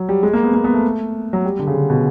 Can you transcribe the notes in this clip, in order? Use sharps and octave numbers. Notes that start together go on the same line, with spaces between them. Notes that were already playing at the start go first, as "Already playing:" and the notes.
Already playing: F#3
G3
G#3
A#3
B3
A#3
B3
A3
F#3
G3
D3
C#3
D3
B2